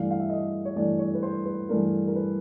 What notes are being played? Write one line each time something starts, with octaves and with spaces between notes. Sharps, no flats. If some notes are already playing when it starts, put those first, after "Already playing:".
Already playing: G2 E3 A3 D4 F5
F5
E5
D#5
C#5
G2 E3 A3 D4 D5
C#5
B4
C5
B4
G2 E3 A3 D4 A#4
A#4
B4